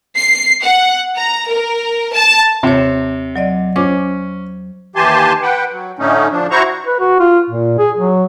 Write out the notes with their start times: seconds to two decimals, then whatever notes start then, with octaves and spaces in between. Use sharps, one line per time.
0.17 C7
0.64 F#5
1.18 A#5
1.49 A#4
2.13 A5
2.63 D#2 C3 C#5
3.36 F#3 D5 D#5
3.76 C#4 C5 D6
4.96 D#2 E3 G4 G#5 A5 C6
5.42 B4 F#5 G5
5.72 F#3
5.99 A2 D3 A3 C#4 D#4
6.32 F3 D4
6.51 E4 F#4 C5 A#5 C#6
6.86 B4
7.00 F#4
7.19 F4
7.50 A#2
7.78 G#4
7.97 F#3